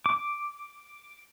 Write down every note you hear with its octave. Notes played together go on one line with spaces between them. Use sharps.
D6